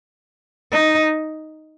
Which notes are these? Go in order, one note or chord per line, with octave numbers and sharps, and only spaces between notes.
D#4